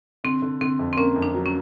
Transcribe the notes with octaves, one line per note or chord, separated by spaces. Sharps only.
D3 C4
D3
D3 C4
F2
C4
A#3 C#4
F2
D4
F#3
C#4